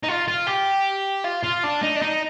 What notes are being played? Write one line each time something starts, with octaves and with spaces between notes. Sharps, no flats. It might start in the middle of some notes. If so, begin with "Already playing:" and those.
D#4
F4
F4
G4
F4
F4
D4
D#4
D4
D#4